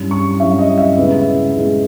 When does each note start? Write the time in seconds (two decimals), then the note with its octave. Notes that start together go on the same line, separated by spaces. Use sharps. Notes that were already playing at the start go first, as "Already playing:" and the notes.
Already playing: G2 G3 C#4 E4
0.11 C#6
0.40 G2 G3 C#4 E4 E5
0.59 D#5
0.78 E5
0.97 C#3 G#3 B3 E4
1.54 C#3 G#3 B3 E4